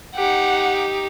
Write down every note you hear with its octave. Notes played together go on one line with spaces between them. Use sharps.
D#4 G4 F#5